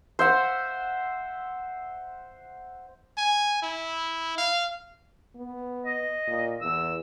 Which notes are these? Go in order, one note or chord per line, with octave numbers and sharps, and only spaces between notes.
C5 E5 F#5
G#5
E4
F5
B3
D#5
A#2
E2 E6